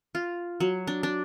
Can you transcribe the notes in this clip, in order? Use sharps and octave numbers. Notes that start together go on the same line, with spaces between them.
F4
F#3
D4
D4